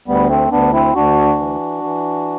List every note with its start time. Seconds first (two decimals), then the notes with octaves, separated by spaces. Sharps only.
0.08 D2 G3 B3
0.29 A3 C4
0.51 D2 B3 D4
0.73 C4 E4
0.95 D2 D4 F#4
1.39 E3
1.84 E3